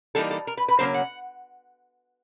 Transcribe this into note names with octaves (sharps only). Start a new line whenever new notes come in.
E3 G3 A#3 D#4 A4
A4
A#4
B4
B4
C#3 F#3 A#3 C#4 C5
F#5